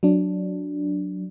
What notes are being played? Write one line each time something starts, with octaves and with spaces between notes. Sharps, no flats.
F#3 D4